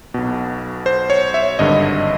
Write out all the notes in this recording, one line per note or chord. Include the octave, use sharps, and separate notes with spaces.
B1 B2
C5
C#5
E5
G#1 G2 D3 D#5